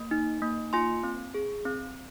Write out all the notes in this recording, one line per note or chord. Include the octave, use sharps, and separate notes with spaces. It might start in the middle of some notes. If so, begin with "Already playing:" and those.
Already playing: A#3
D#4
A#3
F4 G#5 C6
C4
G#4
C4